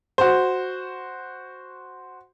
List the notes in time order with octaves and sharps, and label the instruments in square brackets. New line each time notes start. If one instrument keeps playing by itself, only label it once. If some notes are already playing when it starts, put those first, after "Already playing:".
[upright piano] F#4 C5